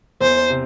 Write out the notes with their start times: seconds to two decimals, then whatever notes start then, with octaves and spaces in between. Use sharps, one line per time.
0.21 E2 C5
0.50 C3